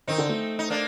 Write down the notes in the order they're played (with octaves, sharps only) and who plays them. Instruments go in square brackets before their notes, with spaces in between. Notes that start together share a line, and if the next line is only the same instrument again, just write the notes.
[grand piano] D#3 [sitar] C4 D#4
[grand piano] D3
A3
[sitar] D#4
A#3 D4